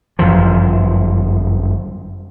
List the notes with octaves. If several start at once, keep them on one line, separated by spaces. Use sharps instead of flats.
G1 F#2 E3 F3